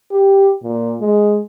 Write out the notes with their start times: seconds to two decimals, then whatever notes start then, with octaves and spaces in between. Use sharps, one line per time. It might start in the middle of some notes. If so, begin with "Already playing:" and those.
0.12 G4
0.63 A#2
1.01 G#3